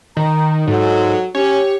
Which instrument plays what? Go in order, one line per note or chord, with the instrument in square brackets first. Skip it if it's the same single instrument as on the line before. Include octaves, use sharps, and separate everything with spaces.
[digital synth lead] D#3 [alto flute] A#5
[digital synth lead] G#2 [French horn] F#3 [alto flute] A4
[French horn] C#4 [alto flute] G4 [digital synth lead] C#5